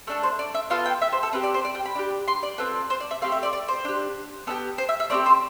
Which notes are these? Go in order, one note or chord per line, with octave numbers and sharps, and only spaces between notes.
A3 D4 A4
C5
D5
E5
B3 F4 A4 F5
G5
E5
C5
A4
C4 G4 B4
D5
C5
D5
G5
B5
D4 G4
C6
D5
C4 F4 A4 B4
C5
D5
E5
A3 C4 G4 F5
E5
D5
D5
C5
D4 G4
B3 D4 G4 A4
C5
E5
E5
A3 C4 G4 D5
C5